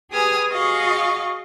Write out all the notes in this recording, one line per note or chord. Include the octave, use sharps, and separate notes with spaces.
G4 G#4 B4 G#5 D#6 F6
F#4 G#4 D#5 F5 C#6